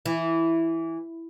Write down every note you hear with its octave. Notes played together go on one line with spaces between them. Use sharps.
E3